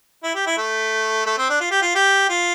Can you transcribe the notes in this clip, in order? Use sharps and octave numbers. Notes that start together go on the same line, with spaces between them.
E4
G4
E4
A3
A3
C4
D4
F4
G4
F4
G4
F4